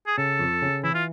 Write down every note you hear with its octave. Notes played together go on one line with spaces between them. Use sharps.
G#4
C#3 A4
F2
C#3
E3 E4
F4